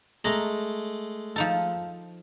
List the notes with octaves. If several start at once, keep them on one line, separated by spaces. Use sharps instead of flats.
G#3 A3 A#5
F3 D#4 A4